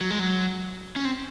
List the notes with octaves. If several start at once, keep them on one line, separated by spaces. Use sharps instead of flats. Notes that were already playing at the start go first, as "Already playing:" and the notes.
F#3
G#3
F#3
C#4
C4